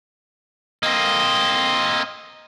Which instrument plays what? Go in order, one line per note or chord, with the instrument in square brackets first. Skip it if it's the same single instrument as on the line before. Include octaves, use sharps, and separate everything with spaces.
[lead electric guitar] A#3 C4 [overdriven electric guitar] D#5